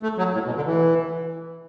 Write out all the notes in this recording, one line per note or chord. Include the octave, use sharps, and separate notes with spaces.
A3
F#3
A2
B2
D3
E3